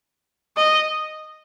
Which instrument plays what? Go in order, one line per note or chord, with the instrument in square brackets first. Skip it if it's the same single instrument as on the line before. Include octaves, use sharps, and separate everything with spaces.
[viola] D#5